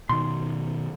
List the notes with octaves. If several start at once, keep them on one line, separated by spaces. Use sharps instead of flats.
B2 D#3 C6